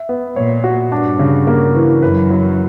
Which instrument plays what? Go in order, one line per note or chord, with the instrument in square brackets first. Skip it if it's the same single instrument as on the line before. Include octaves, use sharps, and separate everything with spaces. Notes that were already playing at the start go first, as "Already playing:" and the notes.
Already playing: [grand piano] E5
B3
[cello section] A#2 [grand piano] C#5
[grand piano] F#4
[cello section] G2 [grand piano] D4
[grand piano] C#3
A#3
E3
[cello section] F#2 [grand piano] B4
[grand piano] F#3